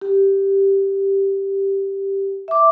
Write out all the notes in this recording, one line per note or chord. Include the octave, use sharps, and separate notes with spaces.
G4
E5 D6